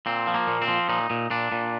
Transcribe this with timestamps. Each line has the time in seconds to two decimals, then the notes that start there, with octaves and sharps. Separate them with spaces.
0.06 A#2 C4
0.27 F3
0.34 A#3
0.47 A#2
0.62 C4
0.68 F3
0.89 A#2 D#4
1.10 A#2
1.30 A#2 D4
1.52 A#2